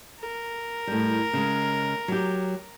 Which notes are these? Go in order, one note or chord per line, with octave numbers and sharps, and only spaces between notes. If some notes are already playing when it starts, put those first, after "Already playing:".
A#4
A2 G3
C#3 G#3
F#3 G4